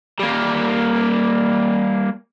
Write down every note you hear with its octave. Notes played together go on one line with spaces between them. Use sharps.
G3 A#3